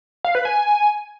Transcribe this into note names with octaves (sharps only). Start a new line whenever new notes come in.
F5
B4
G#5